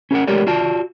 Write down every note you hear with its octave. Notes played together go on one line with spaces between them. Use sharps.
C#4 G#4 A#4 F#5
G#3 A3 G4 A#4 C#5 D5
F4 F#4 D5 A5